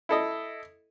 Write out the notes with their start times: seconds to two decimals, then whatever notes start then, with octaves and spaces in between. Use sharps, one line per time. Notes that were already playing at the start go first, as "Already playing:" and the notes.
0.09 E4 A4 D#5